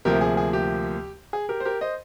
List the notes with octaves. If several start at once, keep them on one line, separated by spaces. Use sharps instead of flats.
D2 C3 F3 A#3 G4 A#4
G#4
G#4
G4
G#4
G4 A#4
C5
G4 A#4
C5 D#5